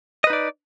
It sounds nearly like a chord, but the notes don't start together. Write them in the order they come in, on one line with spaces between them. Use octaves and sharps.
D#5 B4 D#4 D5